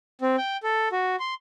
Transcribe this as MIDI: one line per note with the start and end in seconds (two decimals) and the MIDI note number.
0.21 0.36 60
0.38 0.57 79
0.63 0.89 69
0.92 1.16 66
1.20 1.34 84